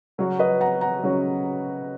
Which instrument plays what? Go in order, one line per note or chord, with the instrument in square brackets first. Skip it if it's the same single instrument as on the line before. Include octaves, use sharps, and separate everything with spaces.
[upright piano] C#3 F#3 C#4 F#4 C#5
[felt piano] B4 D#5
F#5 A#5
F#5 A#5
[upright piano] C#3 F#3 C#4 F#4 C#5